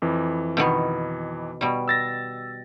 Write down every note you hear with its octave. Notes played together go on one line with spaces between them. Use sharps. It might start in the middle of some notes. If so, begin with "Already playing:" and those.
F2 E3
B2 D#3 B3
B2 G3
E6 A6 A#6